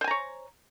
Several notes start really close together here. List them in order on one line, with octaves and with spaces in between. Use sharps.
C5 G#5 A#5 C#5